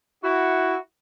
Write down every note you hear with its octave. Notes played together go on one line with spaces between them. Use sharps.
E4 F#4